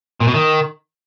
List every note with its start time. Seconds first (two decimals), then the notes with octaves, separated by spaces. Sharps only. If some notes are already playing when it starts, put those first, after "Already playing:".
0.20 A#2
0.27 B2
0.34 D#3